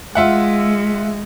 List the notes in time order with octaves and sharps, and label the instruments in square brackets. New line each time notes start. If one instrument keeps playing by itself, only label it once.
[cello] G#3 [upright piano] F4 E5 F#5